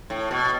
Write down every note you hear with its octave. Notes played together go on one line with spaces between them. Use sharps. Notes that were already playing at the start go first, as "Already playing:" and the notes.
A2
B2